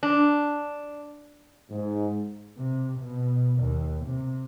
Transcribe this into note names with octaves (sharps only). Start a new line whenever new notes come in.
D4
G#2
C3
B2
D#2
C3